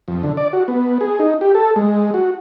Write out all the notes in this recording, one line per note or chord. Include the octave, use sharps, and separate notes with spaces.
F2
D3
D5
F#4
B3
G#4
D#4
G4
A4
G#3
F#4